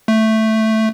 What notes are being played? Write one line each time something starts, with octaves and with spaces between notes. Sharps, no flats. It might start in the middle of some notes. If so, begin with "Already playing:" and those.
A3